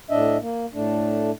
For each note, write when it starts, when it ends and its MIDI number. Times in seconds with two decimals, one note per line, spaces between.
0.10 0.37 45
0.10 0.37 62
0.10 0.37 75
0.10 0.37 76
0.40 0.66 58
0.73 1.31 45
0.73 1.31 57
0.73 1.31 62